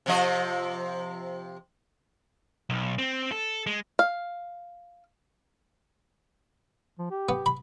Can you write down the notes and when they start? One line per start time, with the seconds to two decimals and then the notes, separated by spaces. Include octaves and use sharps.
0.06 C3 F3 D#5
2.70 B1
2.98 C4
3.32 A4
3.67 G#3
3.99 F5
6.99 F3
7.11 G4
7.29 B3
7.46 B5